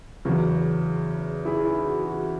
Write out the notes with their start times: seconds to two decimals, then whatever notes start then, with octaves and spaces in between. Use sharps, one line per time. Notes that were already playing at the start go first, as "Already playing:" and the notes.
0.25 E2 C#3 F#3 C#4
1.45 E4 G#4
1.65 E4
1.85 F#4
2.05 F#4